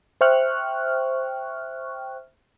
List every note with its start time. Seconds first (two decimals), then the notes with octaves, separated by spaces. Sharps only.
0.21 C5 E5 G5 C#6 F6 F#6